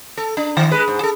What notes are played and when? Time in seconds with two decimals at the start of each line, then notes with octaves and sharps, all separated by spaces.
0.17 A4
0.37 D4
0.57 D#3
0.71 G#3 B4
0.88 G#2
1.00 G#4 A4